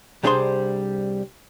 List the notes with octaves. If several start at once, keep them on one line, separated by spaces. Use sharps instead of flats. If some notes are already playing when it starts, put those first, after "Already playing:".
C2 G3 D4 G#4 C5 C6